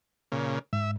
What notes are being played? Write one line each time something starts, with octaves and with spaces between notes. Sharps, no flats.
A#2 C#3
G#2 E5